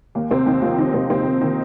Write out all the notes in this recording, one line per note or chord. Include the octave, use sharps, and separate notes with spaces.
D#2 A#3
D#2 C3 C4
D#2 D#3 D#4
D#2 F3 F4
D#3 D#4
D#2 C3 C4
D#2 C3 C4
D#2 A#3
D#3 D#4